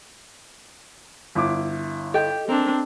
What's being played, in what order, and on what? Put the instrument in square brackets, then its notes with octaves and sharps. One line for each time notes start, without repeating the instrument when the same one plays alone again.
[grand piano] G1 E4 D6
[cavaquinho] G4 G5 [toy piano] A4 D#5
[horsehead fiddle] C4 D4 [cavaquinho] A#4